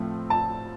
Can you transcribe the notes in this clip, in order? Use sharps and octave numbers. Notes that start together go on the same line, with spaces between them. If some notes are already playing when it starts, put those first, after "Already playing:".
Already playing: A2 F3 A3 C4
A5